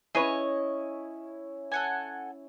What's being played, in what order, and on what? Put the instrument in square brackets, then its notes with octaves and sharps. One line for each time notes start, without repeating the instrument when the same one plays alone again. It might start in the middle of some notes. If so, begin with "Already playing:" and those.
[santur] C#4 E4 [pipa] G#4 B4 C#5 [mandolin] D#5
[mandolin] A4 F#5 G#5